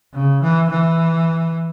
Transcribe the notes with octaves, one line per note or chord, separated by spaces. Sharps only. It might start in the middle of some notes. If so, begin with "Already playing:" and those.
C#3
E3
E3